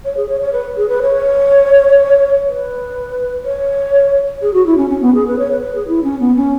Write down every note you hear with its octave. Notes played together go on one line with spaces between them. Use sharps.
C#5
G#4
C#5
C#5
B4
G#4
B4
C#5
B4
C#5
G#4
F#4
E4
C#4
C#4
B3
G#4
B4
C#5
B4
B4
G#4
E4
C#4
B3
C#4